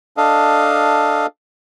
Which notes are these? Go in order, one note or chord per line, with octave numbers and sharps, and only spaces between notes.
D4 A4 D#5 F5